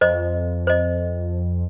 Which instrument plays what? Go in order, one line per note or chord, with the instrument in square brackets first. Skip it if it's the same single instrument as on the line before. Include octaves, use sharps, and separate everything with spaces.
[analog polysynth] F2 [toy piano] C5 D#5
[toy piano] C5 D#5